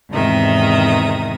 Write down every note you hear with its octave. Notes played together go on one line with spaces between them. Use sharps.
E2 G#2 C3 D#3 E5 D#6